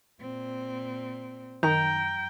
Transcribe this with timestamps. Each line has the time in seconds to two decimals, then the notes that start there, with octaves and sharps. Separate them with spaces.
0.21 A#2 C4
1.63 F#2 D#3 G5 A#5 G6